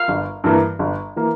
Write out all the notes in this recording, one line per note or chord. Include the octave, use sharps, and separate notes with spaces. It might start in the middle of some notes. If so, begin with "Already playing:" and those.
Already playing: F5
G1
G2 E3 A#3
G1
E3 A#3